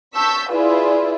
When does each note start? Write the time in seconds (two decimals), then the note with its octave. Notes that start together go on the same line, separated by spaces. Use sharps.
0.14 A5 C#6 E6 G6 B6
0.51 E4 F4 G#4 B4 D5 E5